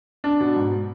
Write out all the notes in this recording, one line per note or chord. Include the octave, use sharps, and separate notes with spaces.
D4
B2
G#2